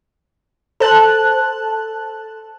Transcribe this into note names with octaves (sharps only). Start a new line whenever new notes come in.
A4 C5 A5 F#6